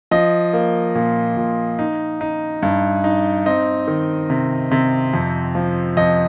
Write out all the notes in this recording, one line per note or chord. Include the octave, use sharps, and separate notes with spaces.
F3 D#5
A#3
A#2
A#2
D#4
D#4
G2
D#4
C4 D#5
D#3
C3
C3
F2
F3
F2 D#5